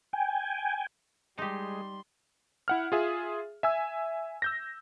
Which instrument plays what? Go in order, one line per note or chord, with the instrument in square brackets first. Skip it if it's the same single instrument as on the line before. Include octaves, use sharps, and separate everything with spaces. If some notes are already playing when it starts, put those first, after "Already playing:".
[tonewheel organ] G5 G#5
[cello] G3 [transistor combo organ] G#3 [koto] D#4 G4 [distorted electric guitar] C6
[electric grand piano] E4 F#5 F6
F4 G#4 E5
E5 G#5 E6
E6 G6 A#6